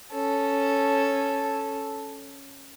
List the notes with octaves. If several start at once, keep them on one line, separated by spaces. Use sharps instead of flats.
C#4 A4